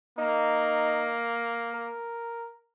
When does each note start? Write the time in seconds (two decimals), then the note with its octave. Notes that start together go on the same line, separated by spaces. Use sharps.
0.18 A#3 D#4
1.74 A#4